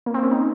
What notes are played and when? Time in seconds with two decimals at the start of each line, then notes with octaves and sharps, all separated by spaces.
0.06 A#3
0.14 C4
0.23 C#4
0.31 D#4